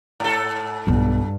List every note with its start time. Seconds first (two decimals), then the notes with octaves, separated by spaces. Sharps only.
0.20 G#2 A4
0.87 B1 G2 F4